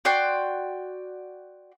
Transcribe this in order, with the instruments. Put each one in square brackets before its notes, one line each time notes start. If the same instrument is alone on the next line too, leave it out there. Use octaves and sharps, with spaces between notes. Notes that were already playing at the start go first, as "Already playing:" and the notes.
[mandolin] F#4 D5 G5 C6